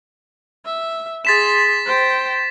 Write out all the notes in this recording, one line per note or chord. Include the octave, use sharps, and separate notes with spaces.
E5
G#4 C6 A6 B6 E7
C5 G5